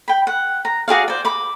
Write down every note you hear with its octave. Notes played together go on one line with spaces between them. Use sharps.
G5 B5
F#5
A#5
F#4 G#4 D5 F5
C5 D5
B5 D6